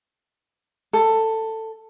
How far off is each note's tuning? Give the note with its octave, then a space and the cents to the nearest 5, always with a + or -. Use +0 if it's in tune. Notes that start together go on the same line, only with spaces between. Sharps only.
A4 +15